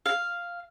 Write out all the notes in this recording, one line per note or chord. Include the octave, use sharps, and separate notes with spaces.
F5